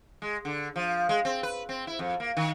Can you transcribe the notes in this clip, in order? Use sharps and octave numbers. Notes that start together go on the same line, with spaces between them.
G#3
D3
F3
G#3
C4
B4
C4
E4
F2
A#3
D#3